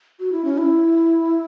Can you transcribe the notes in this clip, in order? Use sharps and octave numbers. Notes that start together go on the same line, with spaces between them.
F#4
E4
C#4
E4